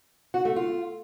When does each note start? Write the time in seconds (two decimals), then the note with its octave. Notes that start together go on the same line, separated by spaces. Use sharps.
0.34 F#4
0.45 A3
0.56 F4